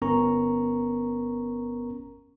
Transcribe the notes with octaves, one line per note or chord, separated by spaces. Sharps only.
G1 B3 C#4 A#4 A#5 C#6